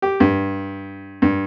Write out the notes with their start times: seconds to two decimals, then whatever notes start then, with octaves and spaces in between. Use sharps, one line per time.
0.02 G4
0.20 G2
1.22 G2